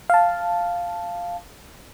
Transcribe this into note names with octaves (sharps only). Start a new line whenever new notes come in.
F5 A5